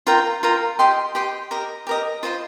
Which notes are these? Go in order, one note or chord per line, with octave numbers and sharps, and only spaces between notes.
F4 A#4 G5 A#5
F4 A#4 G5 A#5
G4 D#5 G5 C6
G4 D#5 G5 C6
G4 A#4 D#5
G4 A#4 D#5
F4 C5 D#5 C6